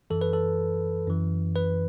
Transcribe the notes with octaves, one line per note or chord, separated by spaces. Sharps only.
F#2 E3 A4
B4
A4
F#2 E3
B4